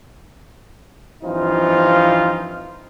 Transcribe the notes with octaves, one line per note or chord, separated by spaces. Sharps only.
G2 E3 F3 C4 D#4 F4